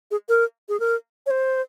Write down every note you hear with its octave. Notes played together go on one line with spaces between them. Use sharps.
G#4
A#4
G#4
A#4
C#5
C5